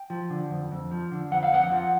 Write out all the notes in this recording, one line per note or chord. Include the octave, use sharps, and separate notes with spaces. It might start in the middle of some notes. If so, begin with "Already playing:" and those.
Already playing: G5
F3
D3
F2
F2
F3
D3
F2 F#5
F5
F2 F#5
F3